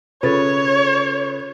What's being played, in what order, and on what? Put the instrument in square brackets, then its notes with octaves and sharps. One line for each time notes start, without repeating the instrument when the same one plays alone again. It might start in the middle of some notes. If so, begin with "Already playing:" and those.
[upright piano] C#3 B4 [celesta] F4 A4 A6 [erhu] C#5